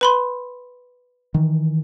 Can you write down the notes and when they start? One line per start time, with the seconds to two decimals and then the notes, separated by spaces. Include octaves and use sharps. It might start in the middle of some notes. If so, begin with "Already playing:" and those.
0.01 B4 B5 C6
1.34 D#3 E3